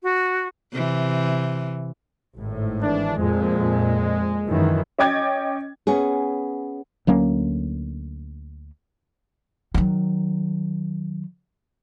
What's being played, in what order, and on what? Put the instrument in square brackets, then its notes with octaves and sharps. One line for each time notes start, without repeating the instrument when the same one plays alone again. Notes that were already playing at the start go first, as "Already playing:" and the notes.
[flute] F#4
[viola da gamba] C3 E3
[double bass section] G#1 A2
[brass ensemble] E3 D4
[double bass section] F2 A#2 [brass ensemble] G#3
[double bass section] F#2 D#3 E3
[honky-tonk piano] C#4 D#5 G5 D6 G#6 A6
[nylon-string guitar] B3 C#4 G#4
[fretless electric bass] D2 F#3 A#3 C#4
[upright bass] D#3 F#3